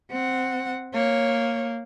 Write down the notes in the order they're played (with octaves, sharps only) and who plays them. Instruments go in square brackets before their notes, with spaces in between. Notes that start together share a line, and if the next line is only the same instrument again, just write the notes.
[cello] C4 F#5
[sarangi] A#3 [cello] C#5